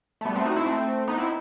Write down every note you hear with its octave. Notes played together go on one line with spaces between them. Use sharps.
A3
G3 B3
A3 C4
D#4 F#4
C4 E4
A3 C4
B3 D#4
C4 E4